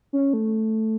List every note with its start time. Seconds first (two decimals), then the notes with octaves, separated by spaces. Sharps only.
0.13 C#4
0.33 A3